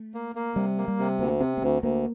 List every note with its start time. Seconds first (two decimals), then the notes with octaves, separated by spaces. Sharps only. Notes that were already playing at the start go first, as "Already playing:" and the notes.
Already playing: A3
0.14 A#3
0.35 A#3
0.55 C3 G3
0.78 A#3
0.88 G3
0.99 C3
1.19 D2 A#3
1.40 C3 C4
1.57 A#3
1.62 D2 C4
1.82 D2 A#3